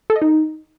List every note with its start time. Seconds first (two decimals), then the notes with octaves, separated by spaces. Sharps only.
0.10 A4
0.16 D#5
0.22 D#4